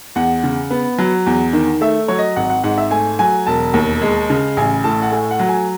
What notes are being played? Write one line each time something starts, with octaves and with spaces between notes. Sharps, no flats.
E2 F#5
C#3
B3
F#3
E2
D#3
A3 E5
F#3 C#5
D#5
G#1 F#5
F#5
G#2 F#5
E5
A3 G#5
F#3 G#5
E1 A5
D#2
G#3
C#3
A1 G#5
A2 A5
F#5
A3 G#5
F#5
F#3
G#5